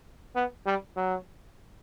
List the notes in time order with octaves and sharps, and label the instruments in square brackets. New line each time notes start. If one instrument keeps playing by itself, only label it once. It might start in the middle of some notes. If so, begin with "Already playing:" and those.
[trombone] B3
G3
F#3